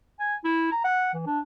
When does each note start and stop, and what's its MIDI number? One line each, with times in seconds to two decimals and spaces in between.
0.20 0.35 80
0.44 0.67 64
0.72 0.84 82
0.84 1.10 78
1.14 1.22 52
1.27 1.40 62